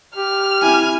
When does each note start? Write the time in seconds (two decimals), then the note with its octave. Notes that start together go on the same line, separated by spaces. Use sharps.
0.16 G4 F6
0.63 C4 E4 G#5